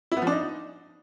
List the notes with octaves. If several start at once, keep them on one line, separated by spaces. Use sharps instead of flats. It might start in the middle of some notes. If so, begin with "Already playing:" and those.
E4
B3
F3
D4
D#4